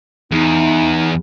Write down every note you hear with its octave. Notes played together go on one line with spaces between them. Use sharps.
E2 D#4